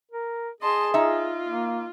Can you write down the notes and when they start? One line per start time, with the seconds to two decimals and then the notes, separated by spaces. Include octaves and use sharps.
0.11 A#4
0.60 G#4 D#5 A5 C6
0.94 D#4 F4 E5
1.48 A#3